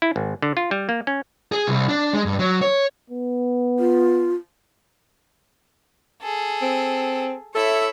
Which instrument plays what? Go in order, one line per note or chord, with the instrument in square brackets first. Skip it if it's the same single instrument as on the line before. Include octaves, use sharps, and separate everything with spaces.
[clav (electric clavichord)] E4
G#1
D3
F4
G3
A#3
C#4
[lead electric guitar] G#4
C2
D4
G#3
G2
F#3
C#5
[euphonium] B3
[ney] F4
[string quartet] G#4 A4
[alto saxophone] C4
[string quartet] E4 C#5 E5 [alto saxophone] A4